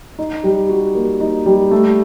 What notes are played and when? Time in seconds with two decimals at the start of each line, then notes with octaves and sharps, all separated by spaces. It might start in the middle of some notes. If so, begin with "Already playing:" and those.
0.19 D#4
0.44 G3
0.69 F#4
0.95 A#3
1.20 D#4
1.46 G3
1.71 A3